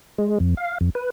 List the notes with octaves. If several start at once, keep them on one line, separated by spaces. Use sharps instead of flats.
G#3
F2
F5
F2
B4